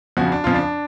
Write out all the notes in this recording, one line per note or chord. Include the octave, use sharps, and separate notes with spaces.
F2 C#3 F3 F#4
D4
F2 C#3 F3 F4
D4